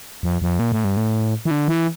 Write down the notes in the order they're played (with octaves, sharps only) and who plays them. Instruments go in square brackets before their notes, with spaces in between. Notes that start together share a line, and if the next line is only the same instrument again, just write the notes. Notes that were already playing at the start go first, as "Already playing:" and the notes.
[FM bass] F2
F2
A#2
A2
G2
A2
E3
D3
E3